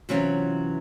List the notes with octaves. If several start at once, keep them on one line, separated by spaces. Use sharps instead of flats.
C3 E3 F#3 B3 C#4 F4